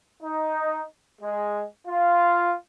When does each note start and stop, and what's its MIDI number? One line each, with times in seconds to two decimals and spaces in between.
0.23 0.83 63
1.22 1.63 56
1.87 2.53 65